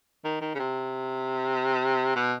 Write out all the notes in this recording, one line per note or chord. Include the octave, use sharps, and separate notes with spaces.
D#3
D#3
C#3
C3
B2